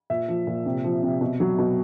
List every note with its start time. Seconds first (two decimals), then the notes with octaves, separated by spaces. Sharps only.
0.10 A#2 E5
0.28 F3
0.47 A#2
0.66 C3
0.84 F3
1.03 C3
1.21 B2
1.40 F#3
1.58 B2